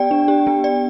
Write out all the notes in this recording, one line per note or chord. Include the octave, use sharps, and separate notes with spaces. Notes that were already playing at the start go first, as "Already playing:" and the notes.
Already playing: B3 G4 D5 G5
D4
G4
B3
D5